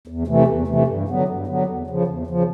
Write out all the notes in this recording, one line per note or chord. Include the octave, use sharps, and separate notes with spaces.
E2
C3 E3 A3
E2
C3 E3 A3
G2
D3 F#3 B3
G2
D3 F#3 B3
E2
C#3 F3
E2
C#3 F3